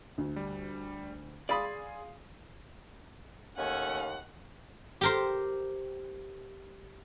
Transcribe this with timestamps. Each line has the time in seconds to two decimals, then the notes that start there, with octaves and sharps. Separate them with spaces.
0.18 D2
0.36 G3
1.49 G#4 D5 F5 B5 C6 D#6
3.58 D#2 A3 C#4 F#5 G#5
5.01 G4 A#4 C5